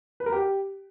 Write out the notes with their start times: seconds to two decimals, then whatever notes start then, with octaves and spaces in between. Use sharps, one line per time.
0.20 B4
0.26 A#4
0.32 G4